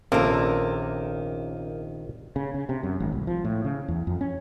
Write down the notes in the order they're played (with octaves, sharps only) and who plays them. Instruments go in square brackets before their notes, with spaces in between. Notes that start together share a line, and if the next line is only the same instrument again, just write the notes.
[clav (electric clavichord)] A#1 C3 D5 [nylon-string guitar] D#3 A4 [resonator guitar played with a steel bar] A#3 [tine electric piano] C#4
[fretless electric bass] C#3
C#3
C3
F#2
G#1
C2
F3
A2
C#3
E2
F2
C#4